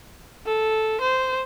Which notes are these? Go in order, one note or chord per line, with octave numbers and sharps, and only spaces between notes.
A4
C5